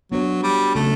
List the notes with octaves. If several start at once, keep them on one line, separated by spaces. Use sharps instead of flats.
F#3 B3 D4 F#4 C#5
G3
C#3 F#3 A3 C#4